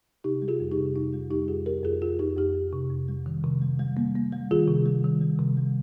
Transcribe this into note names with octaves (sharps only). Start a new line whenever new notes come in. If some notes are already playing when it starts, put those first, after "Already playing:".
C3 D#4 G4
G3
F4 G#4
F2
D#4 G4
C3
F2 D#4
G3 F4
F2 D#4 G4
F2 F4 G#4
F2 G4 A#4
F2 F4 G#4
F2 F4 G#4
F2 D#4 G4
F2 D#4 G4
F2
C3
F2
G3
D#3
C3
G3
G3
A#3
A#3
G3
D#3 F4 G#4
C3
G3
D#3
G3
C3
G3